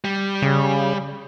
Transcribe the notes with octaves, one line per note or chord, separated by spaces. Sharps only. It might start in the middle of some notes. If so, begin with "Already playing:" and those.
G3
C#3